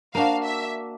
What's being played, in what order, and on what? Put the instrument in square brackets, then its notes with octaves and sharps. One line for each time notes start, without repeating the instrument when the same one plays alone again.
[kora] A#3 D4 F#4 [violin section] F5
[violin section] E5